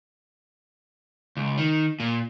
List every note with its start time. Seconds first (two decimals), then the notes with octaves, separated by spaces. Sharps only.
1.37 C#2
1.58 D#3
2.00 A#2